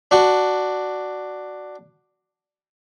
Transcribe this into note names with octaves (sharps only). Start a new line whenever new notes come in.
D4 F#4